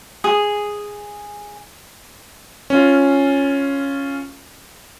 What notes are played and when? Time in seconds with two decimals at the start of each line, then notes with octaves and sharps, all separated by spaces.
0.24 G#4 D#6
2.70 C#4 F4